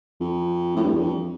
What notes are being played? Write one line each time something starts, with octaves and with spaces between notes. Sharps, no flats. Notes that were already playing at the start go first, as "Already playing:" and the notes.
F2
A2
G2
E2
F2